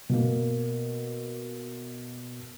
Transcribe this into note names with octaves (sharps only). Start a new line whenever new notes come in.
B2 A#3